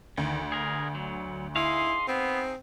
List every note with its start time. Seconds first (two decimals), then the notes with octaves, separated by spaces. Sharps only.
0.17 D2 D#3
0.52 G#4 A#4
0.95 F#3
1.56 D#4 E4 G#4 F5 C6
2.08 B3 C4